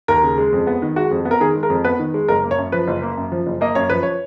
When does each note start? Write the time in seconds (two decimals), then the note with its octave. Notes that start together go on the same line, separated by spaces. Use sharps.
0.08 D#2 A#4
0.23 C#3
0.38 G#3
0.53 F2
0.67 B3
0.82 D#3
0.96 G#3 F#4
1.11 F2
1.25 B3
1.31 A#4
1.40 D#3 G#4
1.55 G#3
1.63 A#4
1.70 F2
1.85 B3 B4
1.99 D#3
2.14 G#3
2.28 F#1 A#4
2.44 A#3
2.51 C#5
2.59 F#2
2.72 F3 B4
2.88 F#1
3.02 A#3
3.17 F#2
3.32 F3
3.47 F#1
3.61 A#3 D#5
3.75 F#2 C#5
3.90 F3 B4
4.03 C#5